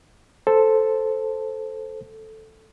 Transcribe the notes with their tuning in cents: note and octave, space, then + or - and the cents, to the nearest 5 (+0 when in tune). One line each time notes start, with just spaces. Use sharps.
A4 +0 C5 +0